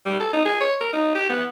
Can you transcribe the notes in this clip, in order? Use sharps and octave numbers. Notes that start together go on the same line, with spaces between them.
G3
A4
D#4
G#4
C#5
A#4
D#4
G4
B3